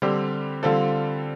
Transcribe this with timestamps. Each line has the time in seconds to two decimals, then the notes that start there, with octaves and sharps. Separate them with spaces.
0.02 D3 G3 C4 G4
0.63 D3 G3 C4 F4 A4